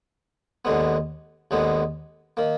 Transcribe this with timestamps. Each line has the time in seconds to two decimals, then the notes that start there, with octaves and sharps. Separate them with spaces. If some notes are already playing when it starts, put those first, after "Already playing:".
0.65 D#2 D3 G#3 B3
1.51 D#2 D3 G#3 B3
2.37 D#3 A#3